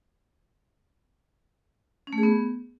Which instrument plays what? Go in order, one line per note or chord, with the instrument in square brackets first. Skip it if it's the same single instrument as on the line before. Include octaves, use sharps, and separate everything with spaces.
[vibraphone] C#4
A3
G#4
B3